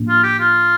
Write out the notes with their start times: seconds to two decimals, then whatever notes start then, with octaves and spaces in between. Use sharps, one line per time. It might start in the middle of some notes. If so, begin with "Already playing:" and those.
Already playing: A2 F3 A#3 D4
0.08 F4
0.23 G4
0.39 F4